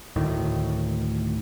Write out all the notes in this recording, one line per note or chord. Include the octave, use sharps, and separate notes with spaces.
D2 A2 D#3